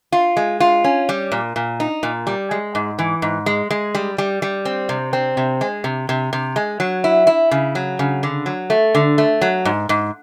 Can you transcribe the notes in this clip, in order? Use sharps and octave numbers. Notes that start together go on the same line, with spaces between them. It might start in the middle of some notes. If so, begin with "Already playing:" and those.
F4
G#3
F4
C#4
G3
A#2
A#2
D#4
A#2
G3
G#3
G#2
E3
G#2
G#3
G#3
G3
G3
G3
C4
C3
C4
C3
G#3
C3
C3
C3
G#3
F#3
E4
E4
C#3
F#3
C#3
D3
F#3
A3
D3
A3
F#3
G#2
G#2